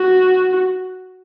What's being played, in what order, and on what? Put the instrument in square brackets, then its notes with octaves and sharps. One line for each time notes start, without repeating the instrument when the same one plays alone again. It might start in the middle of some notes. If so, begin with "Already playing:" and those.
Already playing: [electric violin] F#4